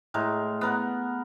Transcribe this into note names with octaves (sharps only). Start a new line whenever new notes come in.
A2 G#3 A#4
B3 A#4 F#5